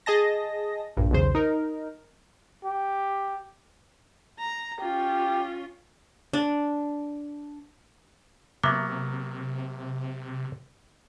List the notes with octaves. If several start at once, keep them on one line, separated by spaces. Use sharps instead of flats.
G#4 D#5 A5 A#6
A#1 G2
B1 E2 C#3 C5
D#4 A#4
G4
A#5
C#4 F4 G4
D4
C3 F#3 A#3 B3 E5 D6